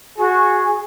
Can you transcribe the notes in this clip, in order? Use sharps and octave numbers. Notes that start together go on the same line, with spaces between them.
F#4 G#4